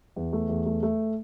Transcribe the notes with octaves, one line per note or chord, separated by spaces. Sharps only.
E2
A3
E2
A3
A3